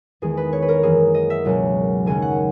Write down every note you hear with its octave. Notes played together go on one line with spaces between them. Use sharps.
E2 D#3 G#3 G#4
B4
C#5
B4
A#4
F#2 E3 A#3 G#4
D#5
E5
C#2 B2 F#3 A#3 C#4
D#2 C#3 F#3 C#4 G#5
F#5